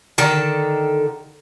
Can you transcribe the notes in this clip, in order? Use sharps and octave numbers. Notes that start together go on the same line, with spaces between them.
D3 D#3 A4